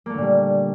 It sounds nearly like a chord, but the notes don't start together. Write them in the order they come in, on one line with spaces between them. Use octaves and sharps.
A#3 A3 D3 A#2 G3